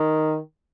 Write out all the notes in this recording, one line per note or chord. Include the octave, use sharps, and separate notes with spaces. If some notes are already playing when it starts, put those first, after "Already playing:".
Already playing: D#3